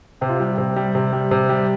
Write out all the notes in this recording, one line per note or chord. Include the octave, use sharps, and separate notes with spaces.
C3 G4
F4
G3 G4
C3
G3
C3
G3
C3
G3